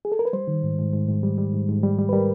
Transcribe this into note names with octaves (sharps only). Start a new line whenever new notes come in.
G#4
A4
A#4
B4
G3 C5
D#3
G#2
G#2
G#2
G#2
G3
G3
G#2
G#2
G3
G3
B4
G3 A#4